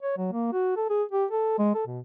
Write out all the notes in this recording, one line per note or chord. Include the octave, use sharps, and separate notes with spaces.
C#5
F#3
A#3
F#4
A4
G#4
G4
A4
G#3
A4
B2